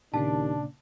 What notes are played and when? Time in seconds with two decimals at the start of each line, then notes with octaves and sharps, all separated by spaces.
0.14 D#2 A#2 C#3 D4 A5